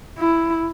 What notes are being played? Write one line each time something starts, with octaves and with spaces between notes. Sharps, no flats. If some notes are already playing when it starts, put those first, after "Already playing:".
E4